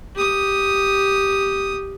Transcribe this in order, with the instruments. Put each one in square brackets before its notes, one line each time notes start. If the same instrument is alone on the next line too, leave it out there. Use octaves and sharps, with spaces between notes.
[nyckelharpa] G4 D#6